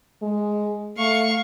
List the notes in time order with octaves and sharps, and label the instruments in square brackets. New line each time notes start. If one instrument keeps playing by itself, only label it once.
[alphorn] G#3
[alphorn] A3 [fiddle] F5 C#6